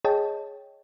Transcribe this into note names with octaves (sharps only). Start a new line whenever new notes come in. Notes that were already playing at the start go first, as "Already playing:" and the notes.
G#4 C#5 D#5 G5 A5